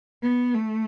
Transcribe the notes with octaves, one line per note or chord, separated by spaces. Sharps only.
B3
A3